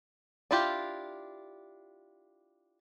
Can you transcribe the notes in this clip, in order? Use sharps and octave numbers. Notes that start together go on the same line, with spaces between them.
D4 E4 F4 G4